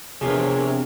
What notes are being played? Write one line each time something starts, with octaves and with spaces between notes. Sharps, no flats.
E2 C3 E3 F3 D4 A#4 C#5